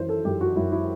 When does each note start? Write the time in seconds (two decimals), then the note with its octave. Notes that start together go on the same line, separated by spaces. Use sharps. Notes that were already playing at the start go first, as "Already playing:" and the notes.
Already playing: F#2 E3 C5
0.09 A4
0.25 F#2 G4
0.41 F#4
0.56 F#2 E4
0.72 E4